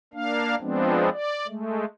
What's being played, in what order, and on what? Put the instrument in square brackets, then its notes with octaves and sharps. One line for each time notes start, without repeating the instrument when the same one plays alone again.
[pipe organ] A#3 D4 F5
F3 G#3 B3 C4 D4
D5
G#3 A3